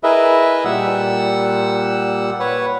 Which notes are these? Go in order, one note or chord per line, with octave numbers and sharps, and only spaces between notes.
E4 G#4 A#4 B4 D#5 E5
A#2 G3 F#5 E6
B4 C#5 F#5